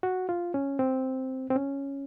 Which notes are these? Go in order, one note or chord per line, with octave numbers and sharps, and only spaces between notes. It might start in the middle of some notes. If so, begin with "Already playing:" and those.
F#4
F4
C#4
C4
C4
C#4